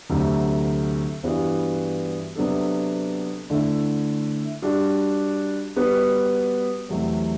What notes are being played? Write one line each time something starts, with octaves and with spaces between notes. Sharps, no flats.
D2 C3 F#3 A3
G2 E3 G3 B3 F#4
C3 F#3 B3 D4 A4
D3 A3 E4
G3 D4 F#4
G3 B3 F#4 B4
E2 C3 F#3 A3